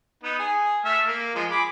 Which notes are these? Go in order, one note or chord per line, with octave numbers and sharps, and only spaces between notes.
B3 D#4
G#4
A3 E5 F6
A#3
F3 G#3
G#4 B5 D6